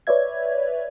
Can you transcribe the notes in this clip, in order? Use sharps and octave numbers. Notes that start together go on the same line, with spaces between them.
B4 C#5 D5 E5 G#6